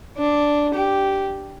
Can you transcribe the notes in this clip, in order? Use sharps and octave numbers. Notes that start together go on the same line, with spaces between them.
D4
G4